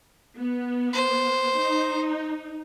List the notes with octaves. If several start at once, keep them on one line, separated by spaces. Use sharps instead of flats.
B3
C5
D#4